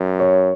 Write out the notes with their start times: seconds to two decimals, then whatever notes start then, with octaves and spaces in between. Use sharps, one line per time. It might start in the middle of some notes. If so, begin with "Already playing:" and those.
Already playing: F#2
0.20 C#5